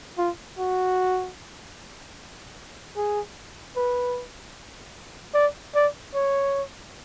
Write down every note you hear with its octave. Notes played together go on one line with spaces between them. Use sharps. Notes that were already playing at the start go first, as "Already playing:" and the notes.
F4
F#4
G#4
B4
D5
D5
C#5